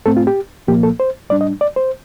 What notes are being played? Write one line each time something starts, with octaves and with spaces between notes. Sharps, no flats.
A2 A3 C4 A4
F4
G4
C2 A#2 F3 A#3 G4
A4
C5
A2 G3 D4 D5
D#5
D5
C5